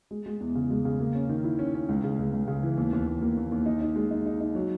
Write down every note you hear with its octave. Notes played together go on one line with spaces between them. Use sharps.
G#3
G#3
E2
C#3
G#3
C#3
A#3
C#4
D#3
E4
C#4
C#4
C#2
C#3
C#2
C#2
C#3
E3
D#2
D#2
D#2
A#3
D#2
D#2
D#4
D#4
G#3
D#4
D#4
D#4
F#3